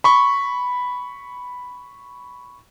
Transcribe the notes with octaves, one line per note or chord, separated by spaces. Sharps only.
B5 C#6